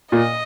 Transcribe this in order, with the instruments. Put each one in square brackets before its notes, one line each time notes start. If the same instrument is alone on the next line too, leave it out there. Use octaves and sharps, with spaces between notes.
[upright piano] A#2 [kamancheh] D#5